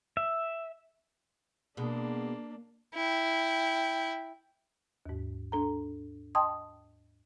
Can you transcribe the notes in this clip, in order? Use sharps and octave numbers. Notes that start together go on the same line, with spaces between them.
E5
B2 G#3 A#3 D4
E4 G5
D#2 G#2
D4 A4 A#5
D#5 G5 A5 C6 D#6